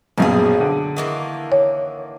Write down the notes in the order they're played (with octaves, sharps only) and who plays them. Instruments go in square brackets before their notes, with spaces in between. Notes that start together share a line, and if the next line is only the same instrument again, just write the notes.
[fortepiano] A#1 F#2 B2 [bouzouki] C4 C#4 G#4
[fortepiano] D3
[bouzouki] D#3 E3 A#3
[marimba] C#5